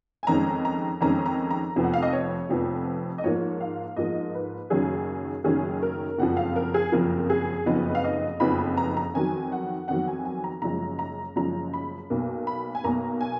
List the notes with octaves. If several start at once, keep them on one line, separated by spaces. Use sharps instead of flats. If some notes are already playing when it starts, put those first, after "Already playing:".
G#5
F2 D#3 G#3 C#4 A#5
A#5
F2 D#3 G#3 C#4 A#5
A#5
A#5
F1 F2 F3 B3
F#5
F5
D#5
C#5
F1 F2 F3 B3
D#5
G#2 F3 A#3 C#5
F5
G#2 F3 A#3 D#5
B4
F#1 F#2 D#3 F#3 C#4 G#4
F#1 F#2 D#3 F#3 C#4 G#4
A#4
F#1 F2 F3 F#5
F5
A#4
G#4
F#1 F2 F3 A#4
G#4
F#1 F2 F3 B3 D#4 B4
F5
D#5
F#1 F2 F3 B3 D#4 B5
B5
A#5
A#5
F2 D#3 F#3 G#5
F#5
F2 D#3 F#3 F#5
G#5
G#5
A#5
F#1 F#2 F3 G#3 A#5
A#5
F#1 F#2 F3 G#3 A#5
B5
B1 B2 A#3
B5
G#5
B1 B2 A#3 A#5
G#5